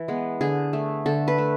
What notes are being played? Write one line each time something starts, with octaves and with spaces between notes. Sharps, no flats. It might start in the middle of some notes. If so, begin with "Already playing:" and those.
Already playing: E3
G#3 B3
D3 G#4
A3
D3 A4
B4
A3